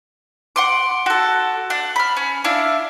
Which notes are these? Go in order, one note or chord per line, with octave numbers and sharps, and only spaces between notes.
F#5 C6 D6
F#4 A4
D4 F#5
B5 F6
C#4
D4 E4 F5